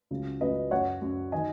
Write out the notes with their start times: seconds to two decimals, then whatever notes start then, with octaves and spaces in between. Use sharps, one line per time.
0.11 C#2 C#3 F#3
0.41 C#2 C#3 F#3 B4 D#5
0.71 F#2 F#3 C#5 F#5
1.02 F#2 F#3
1.32 D#3 F#3 D#5 G#5